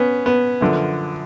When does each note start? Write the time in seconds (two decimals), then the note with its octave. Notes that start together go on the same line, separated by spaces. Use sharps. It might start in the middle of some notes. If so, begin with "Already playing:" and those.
Already playing: B3 C#4
0.26 B3
0.61 F#2 D3 F3